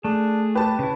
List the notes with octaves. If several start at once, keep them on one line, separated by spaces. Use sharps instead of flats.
A3 D4 G#4
G4 B4 A5
C#3 E4